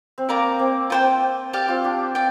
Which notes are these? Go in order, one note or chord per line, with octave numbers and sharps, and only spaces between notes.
C4
A#3 A#4 D5 A#5 D6
C4
C4 F4 C5 G5
G4 D5 F5
C4 F4
D4 G4
D5 G5